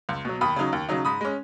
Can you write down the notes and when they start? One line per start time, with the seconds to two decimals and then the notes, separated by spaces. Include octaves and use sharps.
0.09 C#2
0.25 B2 F#3
0.41 D#2 B5 D#6
0.56 C#3 F#3 D#4
0.72 D#2
0.89 C#3 F#3 D#4
1.05 G#2 B5 D#6
1.21 G#3 C#4